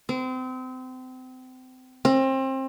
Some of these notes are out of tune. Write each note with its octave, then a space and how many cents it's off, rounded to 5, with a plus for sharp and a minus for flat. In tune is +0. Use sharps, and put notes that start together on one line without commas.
C4 -30
C4 +30